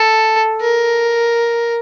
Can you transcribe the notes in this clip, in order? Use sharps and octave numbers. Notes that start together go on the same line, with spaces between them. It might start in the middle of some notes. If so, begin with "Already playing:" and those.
Already playing: A4
A#4